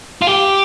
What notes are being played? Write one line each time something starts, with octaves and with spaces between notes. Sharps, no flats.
F4
G4